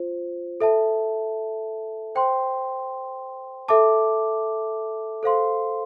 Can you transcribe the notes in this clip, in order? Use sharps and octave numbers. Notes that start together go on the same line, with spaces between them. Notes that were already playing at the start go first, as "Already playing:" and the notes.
Already playing: F4 C5
A4 E5 A5
C5 G5 C6
A4 E5 A5 D6
A4 C5 F5 C6